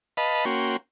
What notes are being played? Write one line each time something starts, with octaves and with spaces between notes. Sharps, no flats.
B4 D#5 F5 A5 B5
A#3 C#4 F#4 G5 C6